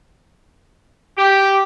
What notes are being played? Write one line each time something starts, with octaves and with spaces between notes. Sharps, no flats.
G4